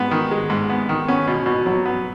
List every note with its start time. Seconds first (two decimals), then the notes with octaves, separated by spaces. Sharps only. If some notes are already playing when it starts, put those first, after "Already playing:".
Already playing: G#2 B3
0.11 D#3
0.31 G#3
0.50 G#2
0.70 B3
0.89 D#3
1.08 B3 C#4
1.27 B2
1.46 B2
1.66 F#3
1.85 B3